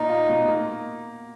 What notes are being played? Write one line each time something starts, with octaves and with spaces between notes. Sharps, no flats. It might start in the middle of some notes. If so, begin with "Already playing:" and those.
Already playing: A#2 D#4
F4
B2
A#3